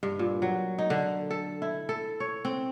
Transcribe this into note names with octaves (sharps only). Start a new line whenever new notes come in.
G2
A#2
F#3
D#4
D3
A4
E4
A4
C#5
C4